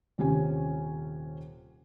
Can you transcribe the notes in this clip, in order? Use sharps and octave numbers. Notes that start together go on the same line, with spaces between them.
D#1 C3 C#4 G4 G#5